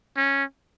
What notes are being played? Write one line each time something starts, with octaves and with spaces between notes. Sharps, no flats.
C#4